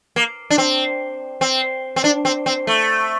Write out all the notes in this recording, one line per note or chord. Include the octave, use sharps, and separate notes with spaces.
A#3
D4
C4
C4
C4
D4
C4
C4
A3